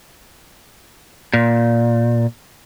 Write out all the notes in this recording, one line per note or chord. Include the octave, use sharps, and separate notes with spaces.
A#2